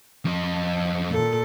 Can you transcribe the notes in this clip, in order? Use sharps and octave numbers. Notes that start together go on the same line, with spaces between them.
F2 D#5
A#2 A4